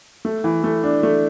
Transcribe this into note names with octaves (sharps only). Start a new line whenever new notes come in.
A3
E3
A3
D4
A3